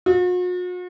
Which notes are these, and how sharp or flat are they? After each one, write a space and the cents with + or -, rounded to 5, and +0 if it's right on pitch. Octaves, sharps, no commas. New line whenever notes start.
F#4 -45